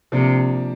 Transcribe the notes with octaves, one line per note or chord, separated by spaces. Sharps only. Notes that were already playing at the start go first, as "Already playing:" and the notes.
C3 F3 A#3 D4